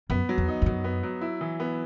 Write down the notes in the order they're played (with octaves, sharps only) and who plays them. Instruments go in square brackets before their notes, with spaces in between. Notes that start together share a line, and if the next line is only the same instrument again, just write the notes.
[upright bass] F#2 [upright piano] B3
[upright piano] F#3
[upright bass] E2
[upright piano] D#4
[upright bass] E2
[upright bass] F#2 [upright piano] F#3
[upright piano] B3
F#3
E4
E3
B3